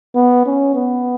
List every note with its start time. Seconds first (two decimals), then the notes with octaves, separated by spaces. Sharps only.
0.16 B3
0.46 C#4
0.75 B3